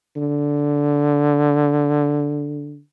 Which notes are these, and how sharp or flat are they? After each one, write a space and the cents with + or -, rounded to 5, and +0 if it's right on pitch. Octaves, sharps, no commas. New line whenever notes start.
D3 -10